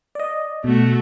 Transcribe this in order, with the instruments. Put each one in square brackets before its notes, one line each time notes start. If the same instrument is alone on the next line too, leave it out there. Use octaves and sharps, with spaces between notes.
[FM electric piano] D5 D#5
[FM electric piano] B2 [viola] A3 F#4